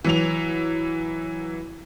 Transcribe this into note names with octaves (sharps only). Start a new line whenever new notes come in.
E3 F#3 F7